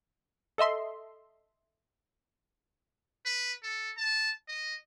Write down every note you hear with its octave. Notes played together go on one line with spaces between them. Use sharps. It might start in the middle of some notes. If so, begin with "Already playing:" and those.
A4 D#5 E5 C6
B4
A4
A5
D#5